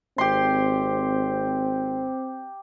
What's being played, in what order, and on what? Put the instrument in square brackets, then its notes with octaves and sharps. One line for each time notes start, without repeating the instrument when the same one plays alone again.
[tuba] G#1 [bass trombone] C4 [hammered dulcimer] G4 C6